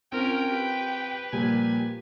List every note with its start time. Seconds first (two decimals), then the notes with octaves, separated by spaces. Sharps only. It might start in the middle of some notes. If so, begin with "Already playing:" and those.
0.12 C4 C#4 F4 A#4 G5
0.48 G4 B4
1.33 A#2 F3 G3 G#5